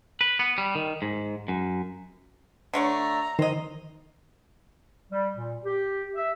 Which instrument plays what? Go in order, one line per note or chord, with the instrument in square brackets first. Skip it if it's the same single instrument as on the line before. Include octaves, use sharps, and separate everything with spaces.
[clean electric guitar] B4
B3
G3
D#3
G#2
F#2
[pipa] D3 A3 C#5 [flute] A#5
[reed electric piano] D#3 [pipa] C5 D#5
[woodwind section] G3
A#2
G4
E5